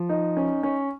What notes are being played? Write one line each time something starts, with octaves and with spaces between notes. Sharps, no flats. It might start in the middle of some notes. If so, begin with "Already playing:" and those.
Already playing: F3
D#4
C#4
C#4